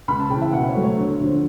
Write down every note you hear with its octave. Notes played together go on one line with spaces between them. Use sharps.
C#2 B5
A5
C#3 E3 G5
E5
B2 F#5
C#5
F#3 A3
C#5
D2
D3 F3